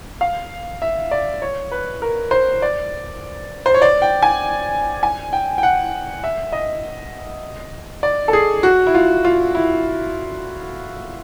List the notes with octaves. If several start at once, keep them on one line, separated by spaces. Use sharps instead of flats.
F5
E5
D5
C#5
B4
A#4
C5
D5
C5
C#5
D5
G5
G#5
G#5
G5
G5
F#5
E5
D#5
D5
A4
G#4
F#4
E4
F4
F4
E4